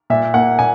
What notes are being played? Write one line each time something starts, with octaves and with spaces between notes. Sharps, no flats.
A#2 E5
A#3 F#5
A#2 G#5